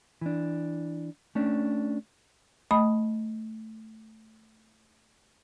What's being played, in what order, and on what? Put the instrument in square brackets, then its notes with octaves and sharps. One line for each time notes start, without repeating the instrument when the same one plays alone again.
[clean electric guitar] E3 D4
A3 C#4 D4
[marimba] A3 D#5 G5 B5 D#6